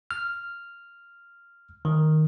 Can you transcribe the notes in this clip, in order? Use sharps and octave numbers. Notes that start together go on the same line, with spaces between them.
F6
D#3